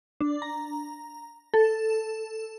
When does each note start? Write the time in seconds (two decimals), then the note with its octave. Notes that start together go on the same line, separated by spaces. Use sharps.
0.21 D4
0.42 A#5
1.54 A4